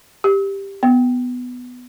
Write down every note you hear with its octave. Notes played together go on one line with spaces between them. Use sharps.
G4
B3